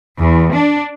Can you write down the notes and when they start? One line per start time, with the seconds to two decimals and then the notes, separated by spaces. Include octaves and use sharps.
0.19 E2
0.53 D4